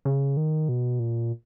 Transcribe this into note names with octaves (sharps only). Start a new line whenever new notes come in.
C#3
D#3
B2
A#2